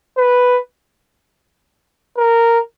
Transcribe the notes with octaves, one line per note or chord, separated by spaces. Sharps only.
B4
A#4